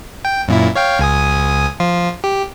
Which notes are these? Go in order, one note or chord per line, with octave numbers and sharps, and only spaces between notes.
G5
F#2 A#2 E4
C#5 F5 G5
C#2 G#5 D#6
F3 F4
G4